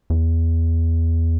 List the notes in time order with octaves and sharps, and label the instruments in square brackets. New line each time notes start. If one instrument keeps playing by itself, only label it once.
[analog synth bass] E2